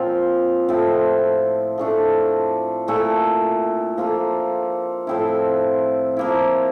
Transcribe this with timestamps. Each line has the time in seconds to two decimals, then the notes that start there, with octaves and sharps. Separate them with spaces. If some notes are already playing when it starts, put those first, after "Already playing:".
Already playing: A#2 F3 C4 F4
0.69 A2 F3 C4 E4
1.78 F3 A3 D4 A4
2.88 A#2 A3 E4 A4
3.97 F3 A#3 F4 A4
5.07 A2 F3 C4 E4
6.17 F3 A#3 E4